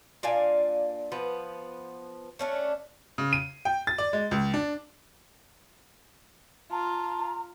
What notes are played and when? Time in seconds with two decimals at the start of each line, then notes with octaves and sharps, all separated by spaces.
0.23 A#2 D4 F5 G#5
1.12 F3 B3 B4
2.39 A3 C#4 D4
3.18 C#3
3.33 D#7
3.65 G5
3.87 A6
3.98 D5
4.13 G#3
4.31 C#2
4.54 D4
6.71 F4 A5 A#5